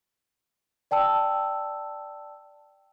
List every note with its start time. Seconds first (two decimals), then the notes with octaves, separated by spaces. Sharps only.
0.91 D5 G5 A5 E6